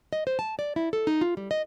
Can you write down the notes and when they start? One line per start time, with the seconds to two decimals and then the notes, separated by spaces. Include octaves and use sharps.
0.13 D#5
0.27 C5
0.39 A5
0.59 D5
0.76 E4
0.93 A4
1.07 D#4
1.21 F4
1.37 G3
1.51 D#5